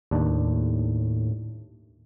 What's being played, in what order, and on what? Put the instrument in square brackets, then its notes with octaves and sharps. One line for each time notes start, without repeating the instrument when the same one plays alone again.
[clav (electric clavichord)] D#2 D4 [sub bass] A2